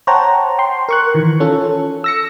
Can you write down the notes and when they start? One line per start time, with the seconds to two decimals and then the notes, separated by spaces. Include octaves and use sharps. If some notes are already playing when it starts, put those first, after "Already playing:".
0.07 C5 C#5 F#5 G5 A5 A#5
0.58 G5 C6
0.89 A#4 C#6 F#6
1.15 D#3 E3
1.40 C#4 F4 A4
2.04 E6 A#6 C#7